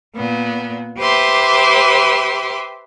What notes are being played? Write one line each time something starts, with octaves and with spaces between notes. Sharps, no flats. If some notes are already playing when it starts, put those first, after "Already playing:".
A#2 B3
G4 B4 C5 E5 C6 D6